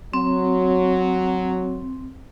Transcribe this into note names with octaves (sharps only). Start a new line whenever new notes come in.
F#3 C4